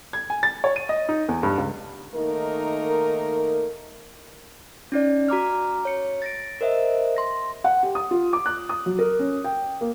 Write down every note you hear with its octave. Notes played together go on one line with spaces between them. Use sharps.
G#6
G#5
A6
C#5
D#7
D#5
D#4
E2
G2
C#2
D#3 A3 A#3 D#4 A#4
C#4 D#4 D5
F#4 A#5 D6 F6
C#5 C#7
A6 A#6 D7
A#4 C5 D#5 E5
C6 A#6
F#5
G4
D#6
F4
D6
F#6
D#6
F#3
A#4
C#4
G5
A#3